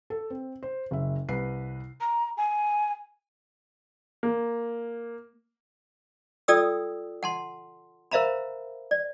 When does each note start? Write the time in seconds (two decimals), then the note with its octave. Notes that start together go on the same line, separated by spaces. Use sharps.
0.10 A4
0.30 C4
0.63 C5
0.91 F#1 E5
1.28 C2 B4 C7
2.01 A#5
2.37 G#5
4.23 A#3
6.48 F4 A4 D5 G5 D#6 E6
7.23 F#5 A5 C6
8.11 A#4 C5 E5 F5 A#5 B5
8.91 D5